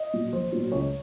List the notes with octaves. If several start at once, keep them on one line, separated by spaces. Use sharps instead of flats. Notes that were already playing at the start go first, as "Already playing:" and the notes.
Already playing: D#5
A#2 F#3
A#1 C5
A#2 F#3
C#2 C#5